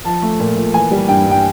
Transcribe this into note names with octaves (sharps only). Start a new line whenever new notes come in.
F3 A5
A3
A#2
A#2
E3 G#5
G3
G2 G5
G2
G5